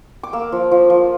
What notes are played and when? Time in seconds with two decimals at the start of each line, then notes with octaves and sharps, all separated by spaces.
0.23 D6
0.33 A#3 E6
0.52 F3
0.71 F3
0.90 F3